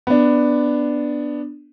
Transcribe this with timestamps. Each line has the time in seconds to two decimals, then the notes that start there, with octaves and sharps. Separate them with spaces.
0.07 B3 D4